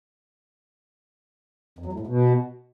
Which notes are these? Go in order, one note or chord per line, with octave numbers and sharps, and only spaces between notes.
F2
F#3
A2
G#2
B2